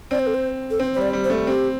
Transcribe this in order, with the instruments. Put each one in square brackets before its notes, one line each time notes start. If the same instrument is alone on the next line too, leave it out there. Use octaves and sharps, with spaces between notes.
[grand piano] C4 [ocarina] D5
[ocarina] C5
A4
C5
A4
[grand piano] C4 [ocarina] C5
[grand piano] G3 [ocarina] C5
[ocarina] D5
[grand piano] G3
[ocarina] C5
[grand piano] A3
[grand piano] C4 [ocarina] G4